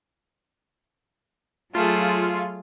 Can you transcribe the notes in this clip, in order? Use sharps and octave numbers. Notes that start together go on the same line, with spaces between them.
F#3 A3 F4 G#4